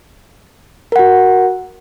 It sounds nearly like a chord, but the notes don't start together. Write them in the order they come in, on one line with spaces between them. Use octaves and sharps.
A#4 F#5 F#4